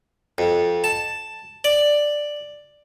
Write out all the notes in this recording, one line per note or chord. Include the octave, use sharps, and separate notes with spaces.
F2
A5
D5